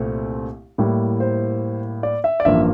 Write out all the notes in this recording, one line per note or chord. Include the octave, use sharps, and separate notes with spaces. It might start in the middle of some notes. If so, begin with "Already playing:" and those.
Already playing: C2 A#2 A3 C4
A2 G3 A#3 E4
C5
D5
E5
D5
A1 G2 F3 A#3 E5